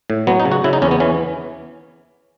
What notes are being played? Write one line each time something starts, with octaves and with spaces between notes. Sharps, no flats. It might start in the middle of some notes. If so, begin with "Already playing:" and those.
A2
F#3 B3
D#4
C#3
F#4
C#3 E4
D#4
E2 C#4
B3
E3 C#4